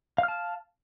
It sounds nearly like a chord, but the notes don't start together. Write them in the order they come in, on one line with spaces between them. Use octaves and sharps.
F5 F6 A5